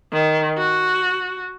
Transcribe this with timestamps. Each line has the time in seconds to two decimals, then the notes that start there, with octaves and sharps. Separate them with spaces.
0.12 D#3
0.58 F#4